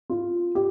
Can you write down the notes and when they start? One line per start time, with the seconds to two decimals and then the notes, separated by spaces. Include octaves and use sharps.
0.10 F4
0.55 G4